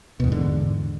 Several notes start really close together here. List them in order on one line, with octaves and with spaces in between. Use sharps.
B2 E2 G#2 D3